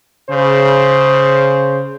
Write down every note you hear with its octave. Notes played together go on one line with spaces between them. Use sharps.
C#3 C5